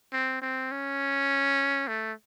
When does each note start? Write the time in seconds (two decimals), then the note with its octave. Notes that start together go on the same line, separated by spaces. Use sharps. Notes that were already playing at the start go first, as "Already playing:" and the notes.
0.12 C4
0.41 C4
0.71 C#4
1.88 A3